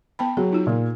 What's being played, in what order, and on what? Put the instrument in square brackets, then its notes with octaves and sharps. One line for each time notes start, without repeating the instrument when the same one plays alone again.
[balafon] B3 G5 B5
[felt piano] F#3 [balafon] G#4
[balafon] D#4 F4
[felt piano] A#2